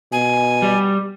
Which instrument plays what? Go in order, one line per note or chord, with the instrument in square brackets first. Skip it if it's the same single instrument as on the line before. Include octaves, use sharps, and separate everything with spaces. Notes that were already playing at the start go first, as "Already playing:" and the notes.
[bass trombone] B2 [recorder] G#5
[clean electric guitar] G3